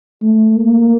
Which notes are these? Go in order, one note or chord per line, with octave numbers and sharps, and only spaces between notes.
A3
A#3